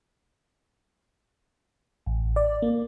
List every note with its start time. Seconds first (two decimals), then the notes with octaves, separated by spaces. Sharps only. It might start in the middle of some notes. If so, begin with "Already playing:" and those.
2.06 A1
2.36 D5
2.62 A#3